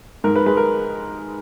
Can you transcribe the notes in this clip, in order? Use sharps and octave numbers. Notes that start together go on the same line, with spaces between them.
G#2 A#4
B4
G#3 B4
A#4